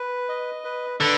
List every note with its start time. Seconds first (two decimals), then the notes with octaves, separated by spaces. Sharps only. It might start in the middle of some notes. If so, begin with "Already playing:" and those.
Already playing: B4
0.29 D#5
0.64 B4
1.00 D3 B4